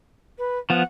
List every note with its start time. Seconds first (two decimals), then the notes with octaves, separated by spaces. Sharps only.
0.38 B4
0.70 F3 B3 F#5